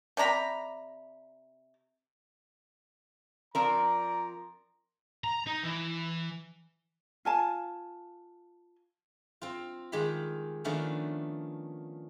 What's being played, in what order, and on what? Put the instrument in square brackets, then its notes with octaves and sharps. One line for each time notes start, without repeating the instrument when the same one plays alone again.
[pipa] C3 D5 A#5 B5
[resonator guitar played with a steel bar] F3 C4 A#4 [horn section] D5 A#5
[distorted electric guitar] A#5
D#4
E3
[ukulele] F4 G#5 A5
[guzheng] C4 F4
D#3 G#3 F4 G4 B5
D#3 F3 A3 B3 C#4 D4